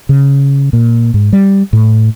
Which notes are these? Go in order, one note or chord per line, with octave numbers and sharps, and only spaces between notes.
C#3
A#2
G#2
G3
A2